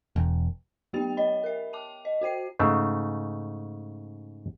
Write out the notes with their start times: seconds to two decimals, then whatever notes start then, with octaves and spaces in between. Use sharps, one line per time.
0.16 E1
0.93 F#3 B3 G4 G5 A6 F7
1.17 C#5 D#5 B5
1.44 A#4 E5
1.73 G5 A5 D6
2.05 D#5
2.21 F#4 C5 G5 C7
2.59 G#2 C#3 A3